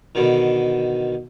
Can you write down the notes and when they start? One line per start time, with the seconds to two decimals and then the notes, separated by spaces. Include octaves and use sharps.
0.15 B2 D3 D#3